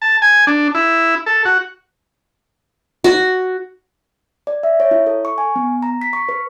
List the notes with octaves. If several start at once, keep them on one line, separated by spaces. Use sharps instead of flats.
A5
G#5
D4
E4
A4
F#4
F#4
D5
E5
C#5
E4
A4
C#6
G#5
B3
A#5
B6
C#6
B4